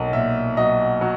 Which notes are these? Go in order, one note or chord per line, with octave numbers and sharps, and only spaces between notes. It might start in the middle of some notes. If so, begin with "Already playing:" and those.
Already playing: B1 A#3 D#5
A#2 E5
F#3 D#5
F#3